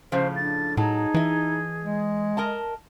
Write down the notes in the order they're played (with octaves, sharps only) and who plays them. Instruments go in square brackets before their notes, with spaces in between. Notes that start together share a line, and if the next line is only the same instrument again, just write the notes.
[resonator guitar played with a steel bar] A2 C#3 F3 [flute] C5
[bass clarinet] D4 [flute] A6
[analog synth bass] A2 [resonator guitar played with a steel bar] F#3 A5 [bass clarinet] D#4 [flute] G#4
[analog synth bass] E3 [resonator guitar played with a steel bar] E4 D#5
[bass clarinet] G#3
[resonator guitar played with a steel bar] A#4 D#5 A5